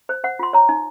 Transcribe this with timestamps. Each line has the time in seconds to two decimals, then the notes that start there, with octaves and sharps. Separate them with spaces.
0.09 C5
0.24 C5 F#5
0.39 F4 C6
0.53 C#5 A#5
0.69 D#4